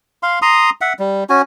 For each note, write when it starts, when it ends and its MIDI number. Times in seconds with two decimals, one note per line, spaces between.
0.23 0.39 77
0.23 0.39 84
0.42 0.70 82
0.42 0.70 84
0.42 0.70 87
0.81 0.93 76
0.81 0.93 78
0.99 1.24 55
1.29 1.42 61
1.29 1.42 66
1.29 1.42 80